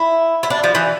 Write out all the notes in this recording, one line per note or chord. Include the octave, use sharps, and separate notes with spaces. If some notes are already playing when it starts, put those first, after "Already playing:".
Already playing: E4
E4
D4
F3
E3